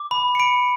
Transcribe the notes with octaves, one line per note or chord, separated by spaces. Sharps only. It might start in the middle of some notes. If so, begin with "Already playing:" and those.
Already playing: D6
B5
C#7
B5 D7